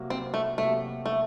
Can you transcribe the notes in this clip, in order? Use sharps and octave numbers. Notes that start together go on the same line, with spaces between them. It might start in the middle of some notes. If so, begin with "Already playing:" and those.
Already playing: C3 F#3 A#3 F#4
C4
A3
C3 F#3 A3 A#3 F#4
A3